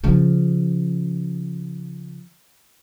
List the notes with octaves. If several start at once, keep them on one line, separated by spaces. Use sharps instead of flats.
C#3 F3